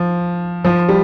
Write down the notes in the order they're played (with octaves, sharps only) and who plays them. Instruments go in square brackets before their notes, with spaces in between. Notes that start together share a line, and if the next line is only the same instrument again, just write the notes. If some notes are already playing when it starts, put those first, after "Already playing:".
Already playing: [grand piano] F3
F3
G3